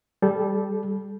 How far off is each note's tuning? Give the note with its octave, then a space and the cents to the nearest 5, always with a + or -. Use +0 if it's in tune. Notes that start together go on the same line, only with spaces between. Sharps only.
G3 +0 A4 -30